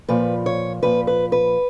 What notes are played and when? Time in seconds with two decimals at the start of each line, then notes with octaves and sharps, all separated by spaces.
0.09 A#2 F3 B4
0.46 C#5
0.83 A#2 F3 B4
1.07 B4
1.32 B4